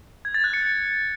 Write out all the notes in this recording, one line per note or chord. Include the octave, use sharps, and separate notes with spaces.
G#6
A6
F#6
C#7